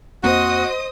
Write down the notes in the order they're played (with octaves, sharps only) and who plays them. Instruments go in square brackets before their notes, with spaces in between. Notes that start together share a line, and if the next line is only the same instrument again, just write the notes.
[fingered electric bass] F2 A#3 C4 [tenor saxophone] F#4 [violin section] C5 D#5 D#6